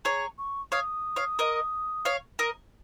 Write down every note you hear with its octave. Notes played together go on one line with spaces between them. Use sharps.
G#4 C#5 A#5
C#6
C#5 F5 D#6
C#5 F5
A#4 D#5
C#5 F5
A#4 D#5